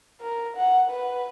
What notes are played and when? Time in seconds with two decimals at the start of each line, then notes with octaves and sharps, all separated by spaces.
0.21 A#4
0.57 F#5
0.90 B4